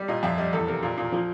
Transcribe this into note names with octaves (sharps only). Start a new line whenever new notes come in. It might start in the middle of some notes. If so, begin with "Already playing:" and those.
Already playing: G3
A#2 D#5
F2 E5
G3 D#5
E2 A4
C3 A#4
A#2
A#2
F3